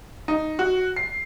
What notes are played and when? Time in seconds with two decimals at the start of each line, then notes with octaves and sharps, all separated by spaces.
0.28 D#4
0.59 F#4
0.96 C7